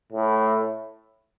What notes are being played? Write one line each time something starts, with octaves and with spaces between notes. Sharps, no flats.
A2